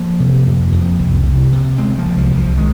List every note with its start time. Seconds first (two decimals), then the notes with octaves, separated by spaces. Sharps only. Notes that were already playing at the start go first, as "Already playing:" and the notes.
Already playing: F3 A#3
0.20 C3
0.46 F2
0.72 F2
0.99 C2
1.25 C3
1.52 C3
1.78 C3 G#3 C4
1.98 F3 A#3
2.05 C2
2.18 F3
2.32 C2
2.38 F3
2.57 D#3 G#3